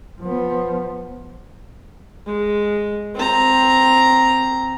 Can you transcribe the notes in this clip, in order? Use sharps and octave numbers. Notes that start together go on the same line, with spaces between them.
F3 B3
G#3
C4 A#5